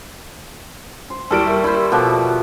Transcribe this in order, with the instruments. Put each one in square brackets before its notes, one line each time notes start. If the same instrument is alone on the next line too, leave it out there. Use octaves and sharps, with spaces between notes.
[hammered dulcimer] C5
[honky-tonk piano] D#2 G3 D7 [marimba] E4 C#6 F6 [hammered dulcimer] A4
[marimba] G4 A#4 E5
[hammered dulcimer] E4 C5 [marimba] A#4
[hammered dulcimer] B2 F3 D6 [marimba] F4 F#4 A4